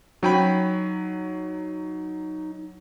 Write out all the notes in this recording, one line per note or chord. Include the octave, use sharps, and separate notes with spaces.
F#3 C#4 D#4 G5 B5